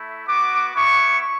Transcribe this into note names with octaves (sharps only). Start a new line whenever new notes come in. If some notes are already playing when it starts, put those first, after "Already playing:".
Already playing: A3 E4
B3 F#4 D6
B3 E4 C#6